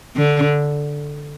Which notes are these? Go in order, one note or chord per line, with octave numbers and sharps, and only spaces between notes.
D3